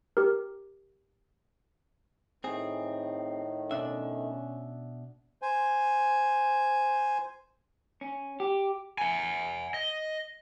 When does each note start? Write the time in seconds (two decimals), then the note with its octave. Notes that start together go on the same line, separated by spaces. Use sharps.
0.17 G4 A#4
2.44 A2 D#3 C4 G#4
3.71 B2 C#4 D4 E5
5.42 C5 G#5
8.01 C#4
8.40 G4
8.98 F#5 G#5
9.74 D#5